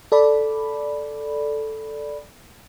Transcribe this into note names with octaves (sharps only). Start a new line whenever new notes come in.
A4 D5 B5